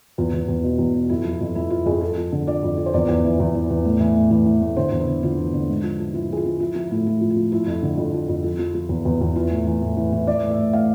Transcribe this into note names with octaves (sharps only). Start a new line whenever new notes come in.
E2 F4
E2
E2
B2
E2
B2
F2 E4
F3
F4
F2
F2 E4
F3 F4
F2 G#4
F3 A4
F3
D3
F3 D5
F2
F3
C5
E2 D5
E2
E3
E2
E3
E2
A2
E3
A2
E3
E3
A2
D3 C5
E2
E4
D3
D3 F4
E2
D3
G#2
F3
F3
F3 E4
F3 G#4
F4
F3
F3 E4
F3 E4
A2 E4
F3 F4
F3
F4
F3
F3 E4
F2
D3
F2
F3
F2
F3
F3
F3
E2
E2
E2
E3 F4
A2
E3
A2
E3
E3
E3 D5
A2
E5
A2
A2 F5